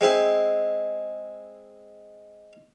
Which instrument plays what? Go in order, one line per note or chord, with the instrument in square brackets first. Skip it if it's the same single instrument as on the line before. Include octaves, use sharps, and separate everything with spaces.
[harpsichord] G#3 C4 E4